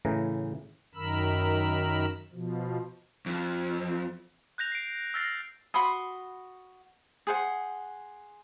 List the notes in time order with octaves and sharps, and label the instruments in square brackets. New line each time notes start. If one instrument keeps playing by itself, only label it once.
[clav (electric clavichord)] A2 C#3 E3 A#5
[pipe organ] F#2 D#3 A#4 B5 E6
B2 F3
[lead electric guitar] F2
[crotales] F#6 G6 A#6 F7
C7 D7
E6 F6 A6 A#6 C7
[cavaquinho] F#4 B5 C6 D#6
G#4 C5 F#5